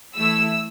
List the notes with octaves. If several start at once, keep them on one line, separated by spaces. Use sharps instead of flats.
E3 A3 E4 E6